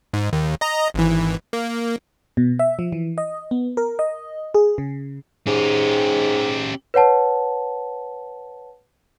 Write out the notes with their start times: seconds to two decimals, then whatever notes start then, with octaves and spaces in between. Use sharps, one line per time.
0.14 G#2
0.33 D#2
0.61 D#5 A#5
0.94 G#1 E3
1.53 A#3
2.37 B2
2.59 E5
2.79 F3
2.92 E3
3.18 D#5
3.51 B3
3.77 A#4
3.99 D#5
4.54 G#4
4.78 C#3
5.47 G#2 C#4 G4
6.94 B4 C#5 F#5 A5